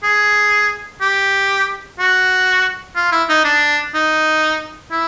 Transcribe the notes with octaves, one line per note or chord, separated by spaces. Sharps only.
G#4
G4
F#4
F4
E4
D#4
D4
D#4
E4